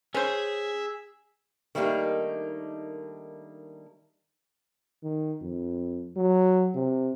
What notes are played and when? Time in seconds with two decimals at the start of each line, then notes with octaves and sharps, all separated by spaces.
0.14 C#4 G#4 C5 E5
1.75 D#3 G3 A3 A#3 D4 D#4
5.03 D#3
5.41 F2
6.17 F#3
6.75 C3